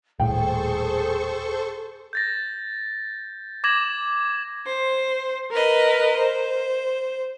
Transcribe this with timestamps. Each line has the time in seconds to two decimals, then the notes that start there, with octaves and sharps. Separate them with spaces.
0.20 D#1 A2 G#4 A4 C5 G5 C#6
2.13 G6 A6 A#6
3.64 D6 G#6 A#6 E7 F#7
4.65 C5
5.51 A#4 B4 D#5
6.16 C5